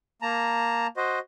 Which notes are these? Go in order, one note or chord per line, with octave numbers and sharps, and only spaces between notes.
A#3 A5 A#5
F#4 C5 D#5